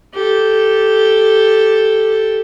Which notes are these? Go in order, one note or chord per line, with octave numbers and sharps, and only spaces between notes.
G4 A4